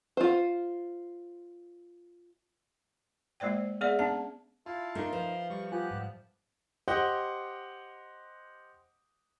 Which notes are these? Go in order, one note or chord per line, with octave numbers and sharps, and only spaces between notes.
F4 C5
G#3 A#3 C5 D5 G5
B3 G#4 D5 E5
B3 C#4 D4 A5
E4 F4 F5 A5
A3 D4 D#4 F4 A#4 C6
F3 B4
G3 C#6
B3 F4 G4 G#5 F#6
G#2
G4 C5 D#5 F#5 G5